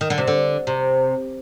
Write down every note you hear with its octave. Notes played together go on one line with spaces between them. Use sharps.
D#3
D3
C3
D3
C3